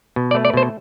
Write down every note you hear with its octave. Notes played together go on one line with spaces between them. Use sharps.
B2
D5
A3
D5
B2 C5